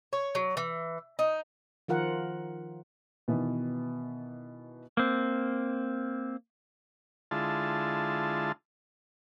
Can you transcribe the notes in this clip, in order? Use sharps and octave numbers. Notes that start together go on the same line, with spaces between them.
C#5
F#3
E3
D#4
D#3 F3 F4 A#4 F#5
B2 D#3 E3 B3
A#3 C4
D3 G#3 E4 F4 A5